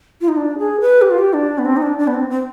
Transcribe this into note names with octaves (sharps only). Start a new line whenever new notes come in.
F4
D#4
D4
G#4
B4
G4
F4
G4
D4
B3
C4
D#4
D4
D4
B3
C4
C4